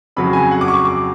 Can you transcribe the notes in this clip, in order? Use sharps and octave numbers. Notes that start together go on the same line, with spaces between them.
F2 C#3 F#3 B5
G#5
F#5
D6
C#6
D6